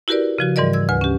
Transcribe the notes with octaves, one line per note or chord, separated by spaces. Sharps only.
E4 F#4 G4 A#4 B4 D5
C#3 F3 F#4
G#2 E3 G3 A#4 D5 D#5
E6 G#6
D2 B4 G#5
C#4 G4